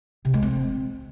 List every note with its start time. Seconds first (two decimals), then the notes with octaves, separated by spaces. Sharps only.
0.25 C3
0.34 G#3
0.42 C4